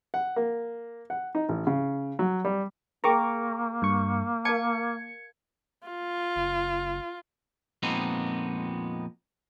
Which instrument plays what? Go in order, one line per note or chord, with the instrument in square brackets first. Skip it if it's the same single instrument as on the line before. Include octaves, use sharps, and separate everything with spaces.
[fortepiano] F#5
A#3
F#5
D#4
A1
C#3
F#3
G3
[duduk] A#3 [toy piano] G#4 A#4 G5 [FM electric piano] A#5 C#6 D6
[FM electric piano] G2 C#6
[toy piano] A#4 F5 A5 [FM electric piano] G#6 C#7
[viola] F4
[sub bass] F#1
[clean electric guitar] F2 A#2 G#3 B3 C4 D#4